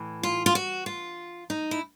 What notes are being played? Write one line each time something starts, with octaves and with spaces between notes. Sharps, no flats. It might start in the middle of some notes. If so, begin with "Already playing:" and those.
Already playing: A2 E3
F4
F4
F#4
F4
D#4
E4